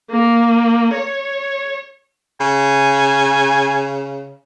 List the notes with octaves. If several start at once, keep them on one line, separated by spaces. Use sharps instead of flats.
A#3
C#5
C#3 G#5